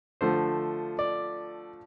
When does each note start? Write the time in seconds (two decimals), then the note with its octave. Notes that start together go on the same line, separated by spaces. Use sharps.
0.21 D3 F3 A3 C5
0.99 D5